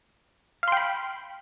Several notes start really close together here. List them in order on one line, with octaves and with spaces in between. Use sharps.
F5 C6 G5 B5